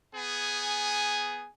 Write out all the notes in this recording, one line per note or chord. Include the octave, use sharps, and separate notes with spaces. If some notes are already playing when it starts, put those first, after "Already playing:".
B3 G#4 G#5